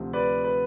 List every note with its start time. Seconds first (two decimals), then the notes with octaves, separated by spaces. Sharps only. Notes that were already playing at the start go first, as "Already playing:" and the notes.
Already playing: D2 C3 F3
0.13 B4 D5
0.44 B4